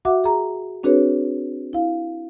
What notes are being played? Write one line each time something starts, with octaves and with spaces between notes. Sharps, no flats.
F#4 E5 F#5 D6
G#4 A#5
C4 D4 F#4 G#4 B4 C#5
E4 F5